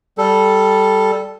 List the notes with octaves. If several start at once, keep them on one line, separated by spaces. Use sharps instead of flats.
G3 A4